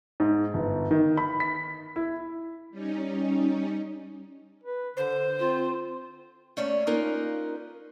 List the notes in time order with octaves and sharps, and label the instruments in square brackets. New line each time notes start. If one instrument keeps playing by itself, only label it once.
[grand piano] G#2
G1
D#3
B5
B6
E4
[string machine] G3 C#4 D#4
[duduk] B4
[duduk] D3 [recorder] C5
[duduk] C4 [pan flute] F4
[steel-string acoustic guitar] A3 A#3 C#4 C#5 D5 E5
A#3 C#4 D#4 F4 A#4 B4